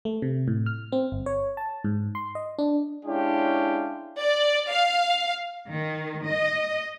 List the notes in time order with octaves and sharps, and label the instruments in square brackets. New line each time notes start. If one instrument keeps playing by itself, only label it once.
[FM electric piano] A3
C3
A2
F6
C4
G1
C#5
A5
G#2
C6
D#5
D4
[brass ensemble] G#3 C#4 D4 E4 F4 G4
[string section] D5
F5
D#3
D#5